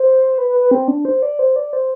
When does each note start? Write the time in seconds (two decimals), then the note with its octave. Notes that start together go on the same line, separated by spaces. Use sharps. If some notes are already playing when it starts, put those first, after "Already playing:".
Already playing: C5
0.38 B4
0.49 B4
0.60 B4
0.71 C4
0.88 D4
1.05 C5
1.22 D5
1.39 C5
1.56 D5
1.73 C5